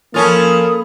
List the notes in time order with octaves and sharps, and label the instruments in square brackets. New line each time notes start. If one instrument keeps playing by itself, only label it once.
[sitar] F3 C#4 F4 [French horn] A#3 [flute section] A4 B5 D#6